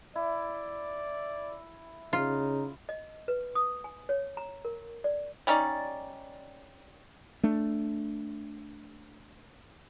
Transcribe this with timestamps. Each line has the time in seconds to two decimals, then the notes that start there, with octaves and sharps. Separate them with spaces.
0.15 E4 D5
2.13 C#3 D#4 F4
2.89 D#5
3.28 B4
3.55 D#6
3.84 G#5
4.09 C#5
4.37 A#5
4.65 A#4
5.04 D5
5.47 G3 C#4 D#4 D5
7.43 A3 D4